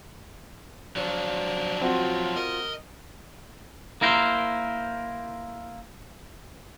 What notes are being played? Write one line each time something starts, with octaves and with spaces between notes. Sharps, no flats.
F3 F#3 D4 C5
C4 F4 F#4
A#4 D#5
A#3 E4 A#4 C5